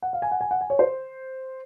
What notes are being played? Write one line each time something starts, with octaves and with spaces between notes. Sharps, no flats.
F#5
F5
G#5
F#5
G#5
F#5
G#5
C#5
C5